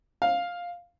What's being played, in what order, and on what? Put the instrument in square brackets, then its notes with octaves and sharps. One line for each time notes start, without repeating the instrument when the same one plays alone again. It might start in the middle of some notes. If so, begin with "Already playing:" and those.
[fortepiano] F5